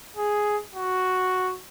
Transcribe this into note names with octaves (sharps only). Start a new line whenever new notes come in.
G#4
F#4